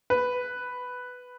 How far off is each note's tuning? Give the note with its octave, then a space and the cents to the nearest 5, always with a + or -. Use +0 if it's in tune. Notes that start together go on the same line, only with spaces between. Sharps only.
B4 +5